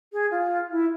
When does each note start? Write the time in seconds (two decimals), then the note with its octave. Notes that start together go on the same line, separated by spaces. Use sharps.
0.13 G#4
0.31 F4
0.71 E4